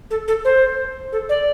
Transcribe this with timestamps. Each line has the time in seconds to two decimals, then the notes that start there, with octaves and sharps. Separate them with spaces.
0.10 A4
0.28 A4
0.45 C5
1.12 A4
1.29 D5